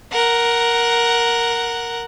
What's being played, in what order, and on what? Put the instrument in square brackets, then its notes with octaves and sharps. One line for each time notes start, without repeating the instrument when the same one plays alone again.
[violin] A#4 F#5